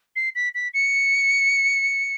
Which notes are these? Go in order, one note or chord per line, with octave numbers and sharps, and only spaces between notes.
C7
B6
B6
C#7